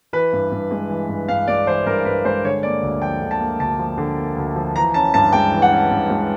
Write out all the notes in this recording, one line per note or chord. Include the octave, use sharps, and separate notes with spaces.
E3 B4
G2
G2
G#3
E3
G2
G2 F5
G#3 D5
E3 C5
G2 A#4
G2 B4
G#3 C5
D3 C#5
A#3 D5
D2
F3 G5
D3
A5
A#3
D2 A5
F3
D3
A#3
D2
F3
E3 A#5
C#4 A5
G2 A5
G#3 G5
E3
F#5
C#4
G2
G#3